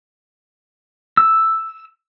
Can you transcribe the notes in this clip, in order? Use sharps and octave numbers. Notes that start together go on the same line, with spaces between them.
E6